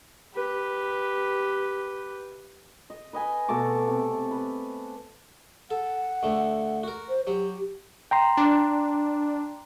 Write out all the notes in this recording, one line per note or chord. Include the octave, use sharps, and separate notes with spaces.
G4 B4
D#5
B4 D#5 G#5 B5
B2 A3 A5 D6
C3
B4
A4 F#5
D2 A3
F#4 A#4
C5
F#3 G4
G5 A#5 C6
D4